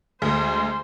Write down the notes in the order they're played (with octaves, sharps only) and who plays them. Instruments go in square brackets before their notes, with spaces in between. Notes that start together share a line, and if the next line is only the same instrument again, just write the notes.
[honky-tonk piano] D2 [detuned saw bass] G#3 [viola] C5